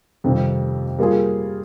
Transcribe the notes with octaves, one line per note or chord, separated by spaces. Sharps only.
F2 C3 D#3 G3
G3 A#3 F4 G#4